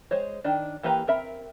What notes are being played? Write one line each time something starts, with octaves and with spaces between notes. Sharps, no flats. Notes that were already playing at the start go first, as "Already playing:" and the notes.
G#3 C5 C#5
D#3 D4
E3 A#3 G4 B4 A#5
C4 A#4 E5 B5